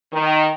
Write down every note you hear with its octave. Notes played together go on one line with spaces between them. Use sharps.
D#3